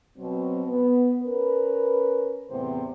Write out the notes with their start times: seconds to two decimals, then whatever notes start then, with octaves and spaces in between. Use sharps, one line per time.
0.18 B2 F#3 C4
0.66 B3
1.22 C#4 A#4 B4
2.50 E2 A2 C3 B3 C5